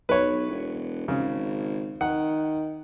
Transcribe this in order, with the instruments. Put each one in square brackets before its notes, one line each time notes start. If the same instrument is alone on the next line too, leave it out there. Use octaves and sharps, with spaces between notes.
[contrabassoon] B1 [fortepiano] B4 C#5
[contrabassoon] E1
[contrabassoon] G#1 [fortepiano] C#3
[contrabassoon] D#3 [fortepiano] F#5